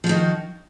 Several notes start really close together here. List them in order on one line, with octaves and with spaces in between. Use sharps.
F3 F#4 D#3